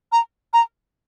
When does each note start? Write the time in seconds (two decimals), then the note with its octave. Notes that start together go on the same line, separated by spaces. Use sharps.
0.12 A#5
0.53 A#5